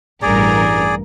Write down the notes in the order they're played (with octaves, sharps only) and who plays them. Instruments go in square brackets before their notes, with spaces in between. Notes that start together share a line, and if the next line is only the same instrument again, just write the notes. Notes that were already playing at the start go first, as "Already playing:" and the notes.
[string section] A1 G2 A#4 [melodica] G#4 D5